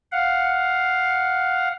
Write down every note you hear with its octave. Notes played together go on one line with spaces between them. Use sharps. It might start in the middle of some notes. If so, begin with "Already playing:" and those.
F5 F#5